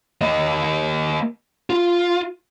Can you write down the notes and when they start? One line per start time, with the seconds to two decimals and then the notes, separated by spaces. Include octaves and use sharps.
0.21 A#3 D#5
1.70 F4